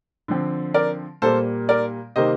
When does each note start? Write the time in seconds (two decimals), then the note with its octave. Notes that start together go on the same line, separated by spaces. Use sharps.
0.28 D3 F3 C4
0.74 A#4 D5
1.22 A#2 G3 A#3 A4 C5
1.69 A#4 D5
2.16 C3 D#3 G3 A#3 C5 D#5